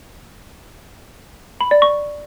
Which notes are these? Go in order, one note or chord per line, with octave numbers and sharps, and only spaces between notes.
B5
D5
C#6